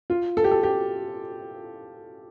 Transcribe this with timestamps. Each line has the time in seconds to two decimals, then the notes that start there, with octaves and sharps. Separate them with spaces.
0.10 F4
0.37 A4
0.44 G4
0.51 A4
0.63 G4